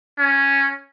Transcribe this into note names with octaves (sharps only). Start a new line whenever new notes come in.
C#4